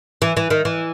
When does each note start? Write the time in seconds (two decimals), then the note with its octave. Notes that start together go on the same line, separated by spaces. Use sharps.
0.22 E3
0.37 E3
0.50 D#3
0.65 E3